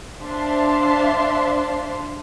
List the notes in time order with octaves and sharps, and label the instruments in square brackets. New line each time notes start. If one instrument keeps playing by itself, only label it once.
[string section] D4 C5 E5 F5 A5 C6